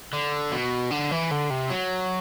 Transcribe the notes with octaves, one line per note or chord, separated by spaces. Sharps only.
D3
B2
D3
E3
D3
C3
F#3